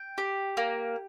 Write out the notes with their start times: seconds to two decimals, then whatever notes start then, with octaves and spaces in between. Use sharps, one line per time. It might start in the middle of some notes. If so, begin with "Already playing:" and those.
Already playing: G5
0.18 G4
0.57 A#3